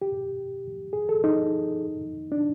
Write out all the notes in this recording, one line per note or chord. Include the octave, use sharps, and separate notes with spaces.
G4
G#4
A4
D#4
D4